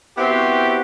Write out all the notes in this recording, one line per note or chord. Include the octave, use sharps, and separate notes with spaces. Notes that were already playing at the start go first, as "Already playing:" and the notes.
B3 C4 E4 F#4 G4